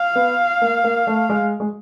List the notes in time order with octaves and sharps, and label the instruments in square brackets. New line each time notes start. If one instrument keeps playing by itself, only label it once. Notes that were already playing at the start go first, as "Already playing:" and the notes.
Already playing: [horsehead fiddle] F5
[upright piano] B3
A#3
A#3
A3
G#3
G#3